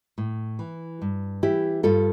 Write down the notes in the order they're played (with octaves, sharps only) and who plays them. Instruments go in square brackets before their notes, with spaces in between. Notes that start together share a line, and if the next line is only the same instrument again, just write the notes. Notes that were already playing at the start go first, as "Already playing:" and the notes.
[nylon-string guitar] A2
E3
G2
E3 E4 G4
G2 F4 A4